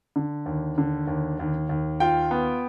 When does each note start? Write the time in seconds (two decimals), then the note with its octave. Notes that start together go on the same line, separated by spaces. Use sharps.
0.16 D3
0.46 D#2
0.78 D3
1.07 D#2
1.40 D#2
1.69 D#2
2.00 F4 G5
2.31 B3